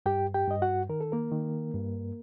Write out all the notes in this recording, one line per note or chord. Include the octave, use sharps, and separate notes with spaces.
G2 G4 G5
G4 G5
G2 D#5
F#4 F#5
D#3 A#4
A4
A#3 A#4
D#3
G2